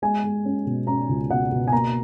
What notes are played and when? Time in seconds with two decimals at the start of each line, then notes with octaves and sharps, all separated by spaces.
0.02 G#3 G#5
0.24 G#3
0.45 C#4
0.66 B2
0.87 C#4 A#5
1.09 C#2
1.30 B2 F#5
1.52 B2
1.68 G#5
1.72 A#3 A#5